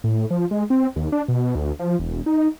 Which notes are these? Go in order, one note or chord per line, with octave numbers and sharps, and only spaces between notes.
A2
F3
G#3
C4
D#2
D4
B2
D2
F3
E1
D#4